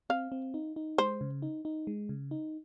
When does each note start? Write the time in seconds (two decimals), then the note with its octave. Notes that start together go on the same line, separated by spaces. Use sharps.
0.10 C4 F5
0.32 C4
0.54 D#4
0.76 D#4
0.98 G#3 C5
1.21 C#3
1.42 D#4
1.65 D#4
1.87 G#3
2.09 C#3
2.31 D#4